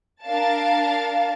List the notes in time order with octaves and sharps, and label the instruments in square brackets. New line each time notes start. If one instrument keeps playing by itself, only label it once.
[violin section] D4 A#4 F5 A5 A6